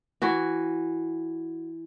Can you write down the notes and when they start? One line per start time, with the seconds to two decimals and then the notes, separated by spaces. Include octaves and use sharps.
0.22 E3 F#4